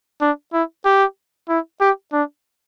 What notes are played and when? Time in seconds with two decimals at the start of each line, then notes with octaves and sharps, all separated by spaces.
0.21 D4
0.53 E4
0.85 G4
1.49 E4
1.80 G4
2.13 D4